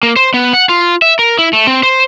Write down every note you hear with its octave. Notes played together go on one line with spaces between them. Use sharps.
A#3
C5
B3
F#5
F4
E5
A#4
E4
A3
C4
C5